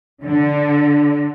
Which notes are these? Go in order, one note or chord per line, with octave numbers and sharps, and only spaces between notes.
D3